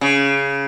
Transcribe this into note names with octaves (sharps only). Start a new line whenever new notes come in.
C#3